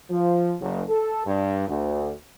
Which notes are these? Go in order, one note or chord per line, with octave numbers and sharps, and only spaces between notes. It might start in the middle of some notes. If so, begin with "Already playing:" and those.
F3
F#1
A4
G2
D2